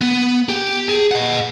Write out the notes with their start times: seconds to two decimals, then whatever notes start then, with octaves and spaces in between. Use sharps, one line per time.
0.01 B3
0.49 G4
0.89 G#4
1.11 D#5 F#5